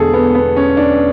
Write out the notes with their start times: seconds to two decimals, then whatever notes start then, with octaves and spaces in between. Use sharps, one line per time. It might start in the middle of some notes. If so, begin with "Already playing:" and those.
Already playing: E1 E2 D3 A3 G#4 A4
0.14 B3
0.35 B3
0.57 C#4
0.77 D4